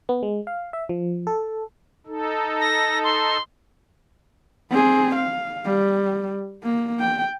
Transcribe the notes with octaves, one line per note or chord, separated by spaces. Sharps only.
B3
G#3
F5
E5
F3
A4
D#4 A4
A#6
C6
C4 G#4
F5
G3
A#3
G5